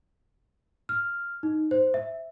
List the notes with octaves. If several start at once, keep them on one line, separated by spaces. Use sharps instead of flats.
F6
D#4
C5
E5